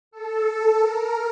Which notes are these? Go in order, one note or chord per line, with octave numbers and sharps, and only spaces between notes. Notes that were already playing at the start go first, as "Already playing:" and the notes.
A4
A#4